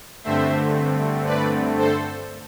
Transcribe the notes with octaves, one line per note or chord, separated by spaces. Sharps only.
G2 D3 A3 C4 C5 E5
B4 D5
A4 C5